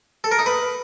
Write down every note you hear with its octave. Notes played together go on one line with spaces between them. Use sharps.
A4
A#4
D#4
B4